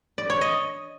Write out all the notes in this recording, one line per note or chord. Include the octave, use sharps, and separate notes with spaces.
D5
C#5
D#5